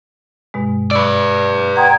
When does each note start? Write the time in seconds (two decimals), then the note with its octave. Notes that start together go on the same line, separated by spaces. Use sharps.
0.54 G2 B2 G#3
0.91 B4 D5 B5 C#6 E6
1.76 F#5 G5 A#5 C6 D#6 G#6